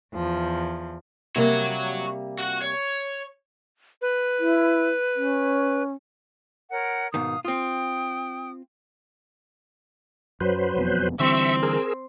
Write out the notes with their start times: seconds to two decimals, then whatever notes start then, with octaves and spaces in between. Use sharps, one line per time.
0.13 E2 F3
1.36 C3 G3 A#3 F#4 C#5
2.38 F#4 F#5
2.62 C#5
4.02 B4
4.39 E4
5.16 C#4
6.70 A#4 C#5 F#5
7.14 G#2 B2 D#3 F5 D#6
7.45 C4 F4 G5 D#6
10.41 F#2 F#3 B4 C5
10.76 E1 F2 B3
11.19 D3 E3 G3 C4 E5 C#6 E6
11.63 G#4 A#4 E6